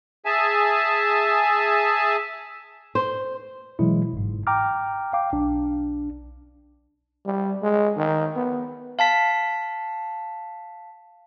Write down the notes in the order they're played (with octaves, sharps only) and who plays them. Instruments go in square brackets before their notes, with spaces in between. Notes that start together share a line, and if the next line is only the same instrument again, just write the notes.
[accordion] G#4 E5 G#5 A5
[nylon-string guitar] C5
[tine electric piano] B2 E3 F#3 G#3 E4
G1 G#2
G5 A#5 D6 F6
F5 G5 D6
B1 D4
[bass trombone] G3
G#3
D#3
B3
[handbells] F5 A5 B6